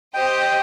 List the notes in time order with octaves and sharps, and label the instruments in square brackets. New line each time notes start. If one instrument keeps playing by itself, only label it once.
[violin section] G4 C5 D#5 [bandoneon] G5